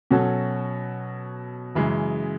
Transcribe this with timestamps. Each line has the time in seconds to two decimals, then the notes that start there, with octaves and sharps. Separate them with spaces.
0.11 B2 F#3 C#4 F#4 A4
1.75 F#2 C#3 E3 G#3